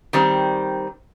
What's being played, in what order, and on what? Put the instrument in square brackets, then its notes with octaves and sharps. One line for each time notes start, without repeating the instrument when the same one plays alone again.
[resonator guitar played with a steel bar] D#3 G3 C4